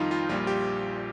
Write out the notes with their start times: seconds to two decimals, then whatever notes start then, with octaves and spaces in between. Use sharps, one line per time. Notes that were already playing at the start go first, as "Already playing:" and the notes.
Already playing: F2 D#3 G3 D#4 F4
0.11 F4
0.29 A#1 A#2 G3 F4
0.47 G4